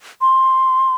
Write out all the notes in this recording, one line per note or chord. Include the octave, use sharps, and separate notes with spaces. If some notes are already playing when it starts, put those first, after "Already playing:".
C6